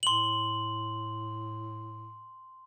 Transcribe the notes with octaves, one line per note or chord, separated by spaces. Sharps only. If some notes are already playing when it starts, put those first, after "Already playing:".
A2 C6 F#7